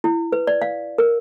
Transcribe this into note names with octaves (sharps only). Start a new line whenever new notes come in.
E4
B4
D5
F5
A#4